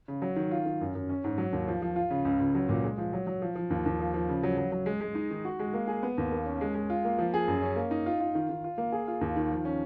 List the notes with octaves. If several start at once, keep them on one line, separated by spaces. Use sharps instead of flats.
C#3
F#3
D#3
F4
D#3
F#2
F#2
C#4
G#2
F#3
D#2
F3
F3
F4
C#3
C#2
C#2
F#3
A#2
G#3
F3
F#3
F#3
F3
F3
D#2
D#2
F3
F3
C#3
F#3
F#3
F#3
G#3
G#3
D#4
D#3
F#4
G#3
A#3
G#4
B3
D#2
A#3
C#4
G#3
G#3
F4
A#3
F3
G#4
F#2
C#4
A#3
D#4
F4
F4
D#3
D#3
F4
A#3
G#4
F4
D#2
D#3
F3
C#4